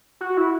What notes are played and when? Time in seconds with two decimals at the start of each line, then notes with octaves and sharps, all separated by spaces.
0.21 F#4
0.37 E4